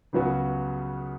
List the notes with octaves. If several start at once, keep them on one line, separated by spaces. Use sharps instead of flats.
C#2 C#3 F#3 B3 F#4